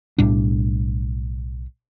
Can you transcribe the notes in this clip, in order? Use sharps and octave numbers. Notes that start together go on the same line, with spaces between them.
B1 A2 G3 D4